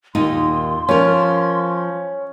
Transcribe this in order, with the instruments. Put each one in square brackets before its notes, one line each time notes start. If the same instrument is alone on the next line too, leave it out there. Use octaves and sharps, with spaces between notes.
[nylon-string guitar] D#2 A#2 D#4 [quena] C6
[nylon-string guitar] F3 A#4 [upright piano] C#4